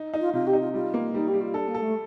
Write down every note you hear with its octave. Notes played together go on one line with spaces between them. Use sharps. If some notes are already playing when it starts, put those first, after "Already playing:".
Already playing: D#4
D#4
F4
C3 F4
G4
D#4
F4
G3 F4
A#3
G3 D#4
G4
G3
F4
D4 A4
A#3
A4
A3